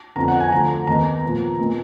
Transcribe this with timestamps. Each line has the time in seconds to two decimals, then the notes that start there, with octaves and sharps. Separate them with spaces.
0.16 F2 D3 F3 B3 A#5
0.28 F#5
0.40 G#5
0.52 D2 D3 F3 A#5
0.87 D#2 D#3 G#3 B3 A#5
1.23 A#2 F3 B3
1.58 A#2 G#3 B3